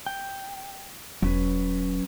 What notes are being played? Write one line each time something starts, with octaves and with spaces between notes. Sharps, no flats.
G5
E1 F#3 C#4 B4